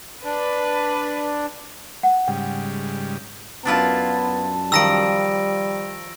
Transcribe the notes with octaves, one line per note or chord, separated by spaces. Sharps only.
D4 B4
F#5
G#2 C#3 G3 G5
F#2 B3 D4 E4 F4 A5
D#3 F3 G3 E6 A#6 D7